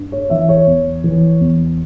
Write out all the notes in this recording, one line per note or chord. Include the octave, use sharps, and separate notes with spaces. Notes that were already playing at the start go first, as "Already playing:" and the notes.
Already playing: G2
C#5
E3 E5
C#5
E2
E3
E2